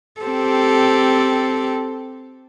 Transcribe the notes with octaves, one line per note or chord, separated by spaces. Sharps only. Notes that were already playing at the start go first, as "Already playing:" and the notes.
C4 G4 A4